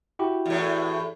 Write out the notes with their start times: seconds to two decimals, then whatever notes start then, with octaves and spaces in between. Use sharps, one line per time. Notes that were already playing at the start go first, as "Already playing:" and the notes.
0.19 E4 F#4 G4
0.46 E2 A2